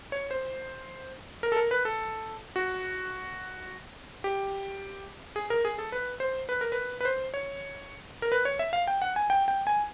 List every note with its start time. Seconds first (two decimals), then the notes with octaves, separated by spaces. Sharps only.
0.12 C#5
0.31 C5
1.43 A#4
1.52 A4
1.57 A#4
1.71 B4
1.85 A4
2.56 F#4
4.24 G4
5.36 G#4
5.50 A#4
5.65 G#4
5.78 A4
5.92 B4
6.20 C5
6.49 B4
6.61 A#4
6.72 B4
7.01 B4
7.05 C5
7.34 C#5
8.22 A#4
8.32 B4
8.45 C#5
8.59 E5
8.73 F5
8.88 G5
9.02 F#5
9.16 G#5
9.30 G5
9.48 G5
9.67 G#5